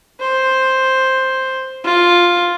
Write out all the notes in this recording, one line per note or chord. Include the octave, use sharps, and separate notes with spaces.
C5
F4